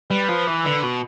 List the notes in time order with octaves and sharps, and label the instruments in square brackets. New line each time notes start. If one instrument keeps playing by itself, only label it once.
[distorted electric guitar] G3 [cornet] B4
[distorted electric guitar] F3
E3
D3
B2